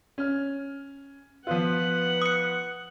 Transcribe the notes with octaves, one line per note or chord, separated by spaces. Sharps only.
C#4 F6
F3 B3 F4 B4 F#5
D#6 C#7